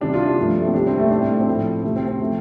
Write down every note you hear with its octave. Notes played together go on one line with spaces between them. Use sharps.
C3 G3 D4
F4
D4
G2 F3 A3
A3
C4
C3 G3 D4
C4
A3
A2 G3 D4
C4
A3
C4
A2 F3 A3
C3 A3
C4
C4
C3 F3 A3